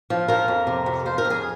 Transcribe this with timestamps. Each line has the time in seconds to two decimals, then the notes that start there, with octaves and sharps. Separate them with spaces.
0.10 F3
0.28 F3 A#4
0.48 F2
0.67 C3
0.86 F2
1.06 F3 C5
1.18 A#4
1.25 F2
1.30 G#4